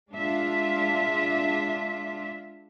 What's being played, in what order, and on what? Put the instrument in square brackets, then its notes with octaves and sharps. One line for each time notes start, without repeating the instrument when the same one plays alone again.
[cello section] G#3 D4 F4 E5